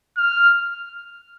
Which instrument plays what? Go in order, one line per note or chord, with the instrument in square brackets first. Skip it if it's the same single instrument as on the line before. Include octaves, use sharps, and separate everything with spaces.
[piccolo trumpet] F6